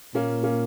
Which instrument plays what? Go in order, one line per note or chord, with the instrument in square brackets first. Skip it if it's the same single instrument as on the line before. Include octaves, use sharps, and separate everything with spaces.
[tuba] A#2 [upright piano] A#3 C#4
[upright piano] A#3 C#4